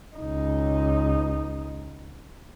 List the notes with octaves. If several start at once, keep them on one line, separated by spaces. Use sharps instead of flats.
C#2 D#4